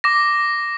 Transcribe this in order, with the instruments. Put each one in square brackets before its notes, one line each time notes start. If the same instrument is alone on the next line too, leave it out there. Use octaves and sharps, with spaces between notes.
[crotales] D6 A#6